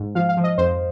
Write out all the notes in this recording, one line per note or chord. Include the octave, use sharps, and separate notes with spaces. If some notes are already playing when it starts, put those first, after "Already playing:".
Already playing: G#2
F3 F5
F5
F3
D#5
F2 C5